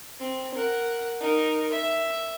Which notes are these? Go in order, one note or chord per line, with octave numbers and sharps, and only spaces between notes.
C4
A#4 F#5
D#4 A#4
E5